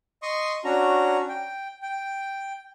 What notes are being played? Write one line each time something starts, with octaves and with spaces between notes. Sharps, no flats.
D#5 C6 C#6 D#6
C#4 D4 F#4 A#5
G5
G5